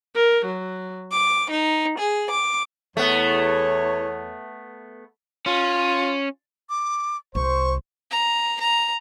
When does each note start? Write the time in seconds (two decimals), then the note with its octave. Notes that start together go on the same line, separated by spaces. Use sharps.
0.16 A#4
0.47 F#3
1.10 D6
1.49 D#4
1.97 G#4
2.29 D6
2.97 E2 A3 B3 C#5
5.46 C#4 F4
6.70 D6
7.35 C2 C5 C#6
8.11 A#5
8.60 A#5